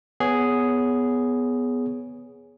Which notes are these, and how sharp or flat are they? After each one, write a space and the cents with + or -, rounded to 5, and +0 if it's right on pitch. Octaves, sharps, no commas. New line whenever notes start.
B3 +0 G#4 +0 C#5 +20